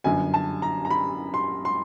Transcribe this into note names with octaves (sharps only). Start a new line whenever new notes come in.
G1 F#2 D3 G#5
A5
A#5
A#5
B5
C6
C6